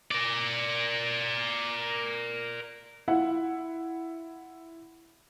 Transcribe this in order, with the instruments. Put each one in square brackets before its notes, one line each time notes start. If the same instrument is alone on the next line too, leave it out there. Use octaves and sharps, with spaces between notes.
[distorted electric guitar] A#4 D5
[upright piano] E4 F4 F#5